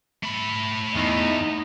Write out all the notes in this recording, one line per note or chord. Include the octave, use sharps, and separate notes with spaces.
A3 B5
E2 D#4